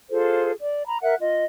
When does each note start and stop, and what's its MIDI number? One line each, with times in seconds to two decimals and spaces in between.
0.10 0.51 65
0.10 0.51 68
0.10 0.51 69
0.10 0.51 72
0.61 0.86 74
0.87 0.99 82
0.87 0.99 83
1.01 1.14 70
1.01 1.14 76
1.01 1.14 78
1.01 1.14 90
1.19 1.45 65
1.19 1.45 75